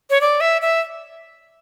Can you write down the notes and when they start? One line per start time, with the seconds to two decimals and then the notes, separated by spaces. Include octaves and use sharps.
0.10 C#5
0.21 D5
0.40 E5
0.62 E5